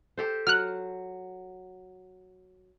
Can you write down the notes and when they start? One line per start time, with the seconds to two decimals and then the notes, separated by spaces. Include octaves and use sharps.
0.17 G4 A4 C5
0.47 F#3 F6 F#6